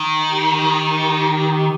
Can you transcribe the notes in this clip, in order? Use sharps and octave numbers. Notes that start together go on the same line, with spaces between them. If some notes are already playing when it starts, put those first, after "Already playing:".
Already playing: D#3
G4